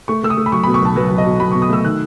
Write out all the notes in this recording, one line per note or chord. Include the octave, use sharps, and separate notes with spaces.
A3 C#6
A3 E6
D#6
A3
B5
F#3 C#6
B2 B5
C#6
B1 A5
F#3 B4
F#3
D#5
B2
F#3 B5
B2 C#6
D#6
A3 E6
D#3 F#6